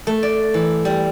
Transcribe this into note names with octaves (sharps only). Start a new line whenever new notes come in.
A3
D5
E3
G3